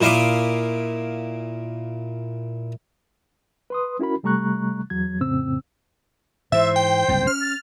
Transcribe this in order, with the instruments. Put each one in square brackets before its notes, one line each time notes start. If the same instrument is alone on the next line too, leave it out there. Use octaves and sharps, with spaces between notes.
[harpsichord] A#2 E4 D#5 F5 D6
[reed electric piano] B4 C6 D#6
C#4 E4 F#4 A#4 B5
C3 G3 A3 A#5 C#6 F#6
E2 F#3 G#6
F2 A2 C#3 C4 E6
[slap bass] G#2 E3 [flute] C5 [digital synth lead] E5
[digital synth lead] G5
[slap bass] F#1 C2 G#2
[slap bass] C#4 [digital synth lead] F6
[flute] A6